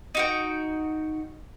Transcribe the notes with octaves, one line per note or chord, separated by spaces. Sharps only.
D#4 F#4 G5